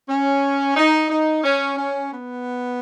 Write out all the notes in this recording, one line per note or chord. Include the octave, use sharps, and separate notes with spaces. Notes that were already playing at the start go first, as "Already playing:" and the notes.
C#4
D#4
D#4
C#4
C#4
B3